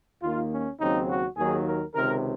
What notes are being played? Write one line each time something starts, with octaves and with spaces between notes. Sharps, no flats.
D#2 D#3 A#3 F4
C#4
D#2 C#3 F#3 C4 D#4
F#4
D#2 D#3 F#3 A#3 G#4
A#4
C#2 C3 D#3 A#4